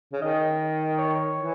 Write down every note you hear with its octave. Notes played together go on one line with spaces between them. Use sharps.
C#3
D#3 D#5
C#5
E3